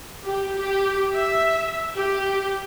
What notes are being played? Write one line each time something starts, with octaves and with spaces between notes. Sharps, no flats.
G4
G4
E5
G4